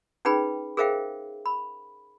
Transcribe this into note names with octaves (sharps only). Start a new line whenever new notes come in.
C#4 D#4 G#4 B4 G5 B5
G#4 A#4 C5 E5 F5 G5
B5